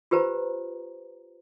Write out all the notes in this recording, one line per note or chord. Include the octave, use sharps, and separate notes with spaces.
F4 G4 B4 C5 A#5